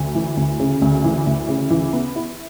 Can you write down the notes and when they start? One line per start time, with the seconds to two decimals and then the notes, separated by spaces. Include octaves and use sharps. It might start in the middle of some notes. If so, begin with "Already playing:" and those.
Already playing: D2
0.15 E3
0.37 D2
0.60 C#3
0.82 D2
1.04 E3
1.27 D2
1.49 C#3
1.70 E3
1.93 B3
2.16 E4